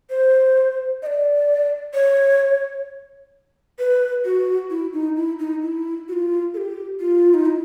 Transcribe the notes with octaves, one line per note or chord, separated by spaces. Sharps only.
C5
D#5
D5
C#5
B4
F#4
E4
D#4
E4
D#4
E4
F#4
F4
A4
G4
F4
D#4
E4